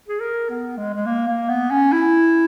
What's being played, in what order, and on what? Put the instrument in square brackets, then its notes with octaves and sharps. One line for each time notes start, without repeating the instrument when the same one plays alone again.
[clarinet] G#4
A#4
B3
G#3
G#3
A#3
A#3
B3
C#4
E4